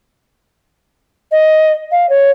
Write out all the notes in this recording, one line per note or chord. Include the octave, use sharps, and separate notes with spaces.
D#5
F5
C#5